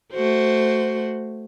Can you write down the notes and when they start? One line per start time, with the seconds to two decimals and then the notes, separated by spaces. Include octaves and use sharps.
0.13 A3 F#4 C5